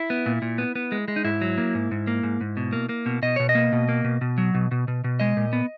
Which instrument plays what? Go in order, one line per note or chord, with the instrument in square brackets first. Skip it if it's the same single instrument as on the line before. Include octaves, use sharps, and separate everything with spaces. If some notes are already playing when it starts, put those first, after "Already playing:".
Already playing: [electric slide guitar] E4
B3
A#2
A#2
B3
B3
G#3
G#3
D#4
G#2 E4
F#3
A#3
G#2
G#2
A#3
G#2
G#2
B2
A#3
A#3
B2
B2 D#5
B2 C#5
D#5
A#3
B2
A#3
B2
B2
F#3
B2
B2
B2
B2
G#3 D#5
A#2
B3